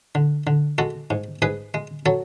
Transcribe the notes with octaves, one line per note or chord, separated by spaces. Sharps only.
D3
D3
G#3 F#4 A4
G#2
G#2 G#4 B4
G#3
F#3 A4 C#5